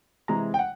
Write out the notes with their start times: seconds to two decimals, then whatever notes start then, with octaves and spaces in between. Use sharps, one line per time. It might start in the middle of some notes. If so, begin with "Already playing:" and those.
0.28 C3 E3 G#3 A#5
0.54 G5
0.59 F#5